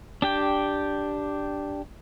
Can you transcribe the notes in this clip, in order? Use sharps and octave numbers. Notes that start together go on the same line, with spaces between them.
D4 G4 G5